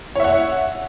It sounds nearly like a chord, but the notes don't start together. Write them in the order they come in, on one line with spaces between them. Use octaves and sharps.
C#5 E5 F#5